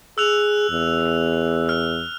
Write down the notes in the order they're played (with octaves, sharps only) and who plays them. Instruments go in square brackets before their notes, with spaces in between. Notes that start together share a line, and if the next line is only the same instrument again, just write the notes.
[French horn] G#4 [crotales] E6 F#6 F7
[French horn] E2
[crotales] F6